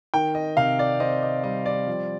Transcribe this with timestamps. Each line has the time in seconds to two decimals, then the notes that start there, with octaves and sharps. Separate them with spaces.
0.14 D#3 G5
0.35 D#5
0.57 C3 F5
0.79 D5
1.00 C4 D#5
1.23 D#5
1.44 G3 D#5
1.66 D5
1.87 F3